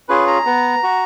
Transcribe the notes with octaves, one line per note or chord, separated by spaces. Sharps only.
C#4 F4 G#4 B4
A#5
B3
F#4